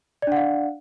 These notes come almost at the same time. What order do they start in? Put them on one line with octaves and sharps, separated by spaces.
D5 D4 F#5 F5